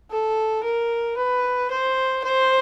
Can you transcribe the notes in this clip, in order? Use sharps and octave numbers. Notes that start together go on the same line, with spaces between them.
A4
A#4
B4
C5
C5